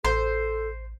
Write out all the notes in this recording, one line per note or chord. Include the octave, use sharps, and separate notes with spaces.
A1 A4 C5